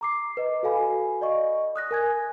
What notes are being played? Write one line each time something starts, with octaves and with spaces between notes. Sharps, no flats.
A#5 D6 C7
B4 D#5
F#4 A4 F5 G#5 B5
D5 D#5 C#6
D#6 F#6 A#6
A#4 G#5 G#6